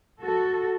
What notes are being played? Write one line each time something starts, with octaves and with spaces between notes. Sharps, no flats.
F#4 A4